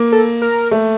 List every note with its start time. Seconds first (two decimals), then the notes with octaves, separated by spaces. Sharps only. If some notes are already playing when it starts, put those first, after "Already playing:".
Already playing: A#3
0.12 A4
0.42 A#4
0.71 A3